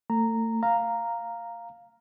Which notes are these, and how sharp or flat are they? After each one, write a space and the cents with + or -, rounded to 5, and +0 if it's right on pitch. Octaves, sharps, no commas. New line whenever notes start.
A3 +35 A#5 -10
F5 +0 A#5 -5